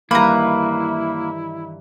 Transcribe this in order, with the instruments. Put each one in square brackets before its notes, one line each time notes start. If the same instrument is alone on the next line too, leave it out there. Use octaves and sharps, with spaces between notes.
[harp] G2 D#3 E3 [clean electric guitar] A#3 [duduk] E4 [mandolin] B4 A#5